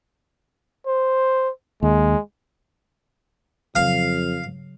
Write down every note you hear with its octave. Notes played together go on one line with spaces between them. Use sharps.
C5
D#2 G#3
F2 C#3 F#3 F5